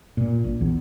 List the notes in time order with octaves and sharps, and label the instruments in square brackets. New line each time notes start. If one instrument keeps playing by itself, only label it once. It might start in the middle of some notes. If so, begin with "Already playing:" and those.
[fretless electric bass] A#2
A#1
E2